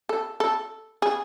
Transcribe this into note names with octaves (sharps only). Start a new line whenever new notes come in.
A4
A4
G#4